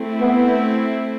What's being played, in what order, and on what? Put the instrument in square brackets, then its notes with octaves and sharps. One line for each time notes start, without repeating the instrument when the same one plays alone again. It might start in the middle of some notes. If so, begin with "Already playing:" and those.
Already playing: [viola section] A3 C4 E4
[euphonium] B3